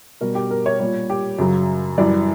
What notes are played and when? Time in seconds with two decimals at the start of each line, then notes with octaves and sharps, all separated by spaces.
0.21 B2 G3 A#4
0.35 G4
0.51 A#4
0.66 C#5
0.80 A#2 G3 C#5
1.10 G4
1.39 F#2 C#3 F#3
1.98 F#2 E3 G3 D5